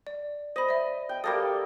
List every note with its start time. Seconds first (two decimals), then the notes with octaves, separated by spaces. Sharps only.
0.07 D5
0.56 C5 D#5 B5
0.69 D5 E5
1.09 G5
1.24 G3 A#3 A4 D#6 A#6